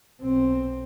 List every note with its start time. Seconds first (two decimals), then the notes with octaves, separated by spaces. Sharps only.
0.21 B1 C4